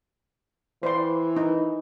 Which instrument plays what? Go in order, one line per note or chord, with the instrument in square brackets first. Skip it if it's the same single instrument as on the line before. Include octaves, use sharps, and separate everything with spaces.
[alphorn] E3 [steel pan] C5 D5 C6
[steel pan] D#4